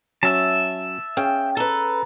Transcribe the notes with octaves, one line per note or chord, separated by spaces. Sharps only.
F#3 C#4 E5 A5
C#4 G#4 F5 G5
A4 B4 A#5